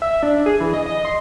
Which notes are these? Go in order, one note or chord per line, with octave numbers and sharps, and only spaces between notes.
E5
D4
G#4
E3
D#5
D#5
C6